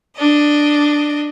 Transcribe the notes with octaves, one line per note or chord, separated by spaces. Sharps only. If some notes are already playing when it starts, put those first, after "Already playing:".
D4 D#5